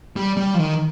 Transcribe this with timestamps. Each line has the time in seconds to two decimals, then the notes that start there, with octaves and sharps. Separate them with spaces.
0.16 G3
0.37 G3
0.54 F3
0.58 D#3